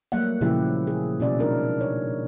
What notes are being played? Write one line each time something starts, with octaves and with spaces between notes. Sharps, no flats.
F#3 G3 A3 A#3 E5 F#5
A#2 C#3 F3 E4 G4 E5
G#4
B2 C#4 D5 E5
G#3 D4 D#4 A#4
C#5